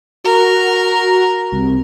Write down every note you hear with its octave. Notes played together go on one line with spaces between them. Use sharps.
F#4 A#4
C2